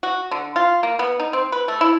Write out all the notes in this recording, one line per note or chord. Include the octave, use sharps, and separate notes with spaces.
F#4
D3
F4
A#3
B3
D#4
C4
B4
A3
E4